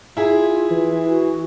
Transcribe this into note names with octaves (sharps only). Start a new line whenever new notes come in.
E4 F4 G#4
E3
F#4